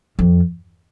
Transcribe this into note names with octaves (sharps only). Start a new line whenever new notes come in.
F2